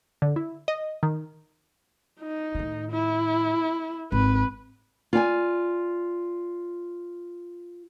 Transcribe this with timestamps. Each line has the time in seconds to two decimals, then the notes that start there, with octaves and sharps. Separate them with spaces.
0.22 D3
0.36 E4
0.68 D#5
1.03 D#3
2.20 D#4
2.55 A2 D#3
2.91 E4
4.12 G#1 B4
5.13 F4 D5 G5 G#5